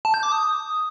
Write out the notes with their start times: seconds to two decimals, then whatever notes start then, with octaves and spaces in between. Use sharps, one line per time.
0.05 A5
0.14 G6
0.23 D6
0.32 D#6